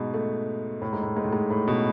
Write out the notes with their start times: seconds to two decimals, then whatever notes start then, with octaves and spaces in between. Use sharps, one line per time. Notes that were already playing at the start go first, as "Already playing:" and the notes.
Already playing: G#2 B2
0.14 A3
0.82 A2
0.93 G#2
1.03 A2
1.17 G#2
1.24 A2
1.33 G#2
1.50 A2
1.68 B2